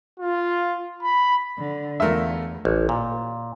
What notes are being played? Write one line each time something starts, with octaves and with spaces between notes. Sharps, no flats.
F4
B5
D3
E2 A3 F4 A#4 E5
A1
A#2